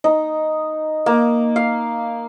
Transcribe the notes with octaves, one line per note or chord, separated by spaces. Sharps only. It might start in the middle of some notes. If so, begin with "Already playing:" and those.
D#4
A#3
F5